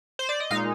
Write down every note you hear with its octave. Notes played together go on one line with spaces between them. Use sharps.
C5
D5
D#5
A#2 G#3 D#4 F5